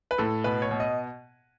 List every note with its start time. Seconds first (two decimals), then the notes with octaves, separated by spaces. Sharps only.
0.11 B4
0.18 A2 A4
0.44 B2 B4
0.62 C#5
0.71 B2
0.80 D#5